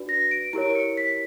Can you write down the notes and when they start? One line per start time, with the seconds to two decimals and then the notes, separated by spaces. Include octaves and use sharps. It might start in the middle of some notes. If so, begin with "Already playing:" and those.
Already playing: D4 F#4 B4 D5
0.09 A#6
0.31 D7
0.53 E4 G4 A#4 C#5 D7
0.75 C#7
0.97 B6